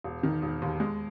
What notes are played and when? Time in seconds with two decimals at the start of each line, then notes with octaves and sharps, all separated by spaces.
0.04 E1
0.23 D#3
0.42 E1
0.62 D#2
0.80 G#3